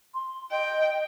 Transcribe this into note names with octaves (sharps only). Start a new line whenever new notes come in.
C6
D#5 G5